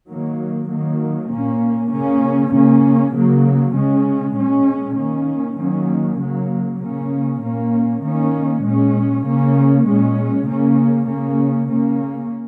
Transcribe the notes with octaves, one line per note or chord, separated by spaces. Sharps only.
D#3 F#3 A#3
D#3 F#3 A#3
A#2 A#3 C#4
C#3 A#3 C#4
C#3 A#3 C#4
C#3 F#3 A#3
C#3 G#3 C#4
A#2 G#3 C#4
D#3 A#3 C#4
D#3 F#3 A#3 C#4
C#3 F#3 A#3
C#3 A#3 C#4
A#2 A#3 C#4
D#3 A#3 C#4
A#2 G#3 C#4
C#3 A#3 C#4
A#2 G#3 C#4
C#3 A#3 C#4
C#3 A#3 C#4
C#3 A#3 C#4